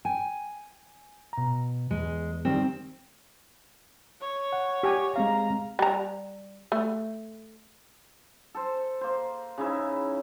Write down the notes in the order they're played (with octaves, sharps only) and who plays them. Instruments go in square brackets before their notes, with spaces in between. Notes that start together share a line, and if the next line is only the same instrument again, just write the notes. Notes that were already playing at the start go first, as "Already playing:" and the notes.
[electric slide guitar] G5 [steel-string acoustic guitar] G#5
[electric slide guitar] B2 A#5
[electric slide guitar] E2 [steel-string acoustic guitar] G#3
[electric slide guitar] D#3 G3 [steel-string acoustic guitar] C4
[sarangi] C#5
[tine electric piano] F#5
[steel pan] G4 G#5
[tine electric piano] G#3 C4 F5 [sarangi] A#5
[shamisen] G3 A#5
A3
[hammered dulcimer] A4 C5
A#3 C5
C#3 D#4 E4